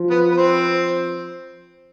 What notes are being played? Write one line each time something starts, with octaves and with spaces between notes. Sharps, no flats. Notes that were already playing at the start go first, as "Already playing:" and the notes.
Already playing: F3
B3 B4
B4
C4 C5